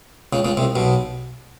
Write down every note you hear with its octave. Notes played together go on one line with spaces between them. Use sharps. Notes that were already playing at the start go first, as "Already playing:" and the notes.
C#2 C#3
C#2 C#3
C2 C3
B1 B2